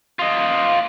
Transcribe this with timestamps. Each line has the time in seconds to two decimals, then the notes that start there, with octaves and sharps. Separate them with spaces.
0.19 F4 D#5